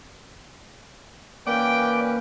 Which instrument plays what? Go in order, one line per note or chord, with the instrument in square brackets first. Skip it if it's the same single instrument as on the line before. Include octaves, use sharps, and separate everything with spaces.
[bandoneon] E3 C#4 B4 [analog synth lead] A#3 [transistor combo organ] D5 [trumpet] G5